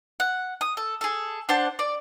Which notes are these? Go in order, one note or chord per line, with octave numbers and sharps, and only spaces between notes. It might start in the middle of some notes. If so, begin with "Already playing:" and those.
F#5
D#6
A4
G#4 A4
D4 C5 F#5 A5
D5